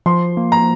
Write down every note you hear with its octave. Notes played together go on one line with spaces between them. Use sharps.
F3 C6
A#3
A#5